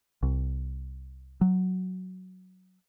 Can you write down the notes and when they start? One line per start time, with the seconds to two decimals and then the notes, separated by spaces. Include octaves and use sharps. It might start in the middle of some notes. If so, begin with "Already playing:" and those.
0.23 C2
1.41 F#3